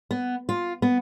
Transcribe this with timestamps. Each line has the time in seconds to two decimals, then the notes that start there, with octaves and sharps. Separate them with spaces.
0.11 B3
0.49 F4
0.82 B3